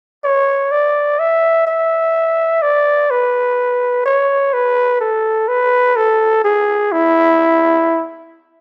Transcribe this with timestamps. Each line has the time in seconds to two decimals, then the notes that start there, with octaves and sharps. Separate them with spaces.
0.24 C#5
0.72 D5
1.19 E5
1.67 E5
2.62 D5
3.11 B4
4.06 C#5
4.53 B4
5.01 A4
5.48 B4
5.96 A4
6.44 G#4
6.92 E4